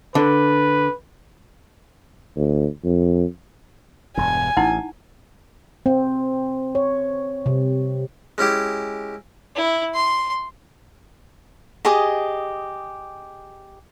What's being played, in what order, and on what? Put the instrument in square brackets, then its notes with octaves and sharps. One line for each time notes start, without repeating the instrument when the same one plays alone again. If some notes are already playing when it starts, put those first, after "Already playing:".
[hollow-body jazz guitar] D3 [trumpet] B4
[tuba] D2
F2
[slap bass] E1 G2 [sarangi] G#5
[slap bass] A1 [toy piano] D#4 E4 F#5
[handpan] C4
C#5
C3
[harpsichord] G#3 C#4 E4 G4
[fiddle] E4
C6
[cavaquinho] G4 G#4 D#5